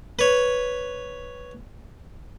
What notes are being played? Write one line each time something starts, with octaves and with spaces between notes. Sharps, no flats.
B4 C#5